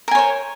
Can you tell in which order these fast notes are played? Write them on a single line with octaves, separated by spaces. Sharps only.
A#4 G#5 C#5 C5